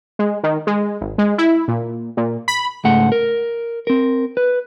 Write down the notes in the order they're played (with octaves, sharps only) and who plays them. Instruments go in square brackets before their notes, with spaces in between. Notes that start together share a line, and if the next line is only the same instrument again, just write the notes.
[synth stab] G#3
D#3
G#3
G#1
G#3
E4
A#2
A#2
B5
[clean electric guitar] C#2 G#2 A3 F#5
A#4
C4 A#4
B4